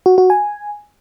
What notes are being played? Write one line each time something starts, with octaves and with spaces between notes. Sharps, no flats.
F#4
F#4
G#5